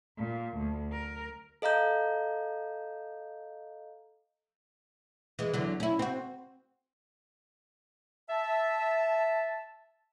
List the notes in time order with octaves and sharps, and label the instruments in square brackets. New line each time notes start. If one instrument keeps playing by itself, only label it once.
[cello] A#2
D2
A#4
[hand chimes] A4 D#5 F5 A#5 G6
[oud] E3 G#3
E2 D3 F#3
C#4 E4
C4 F#4
[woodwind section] E5 A5